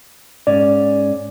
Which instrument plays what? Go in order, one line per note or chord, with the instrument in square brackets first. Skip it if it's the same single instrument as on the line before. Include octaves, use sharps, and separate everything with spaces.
[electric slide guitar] G#2 C#4 [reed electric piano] D5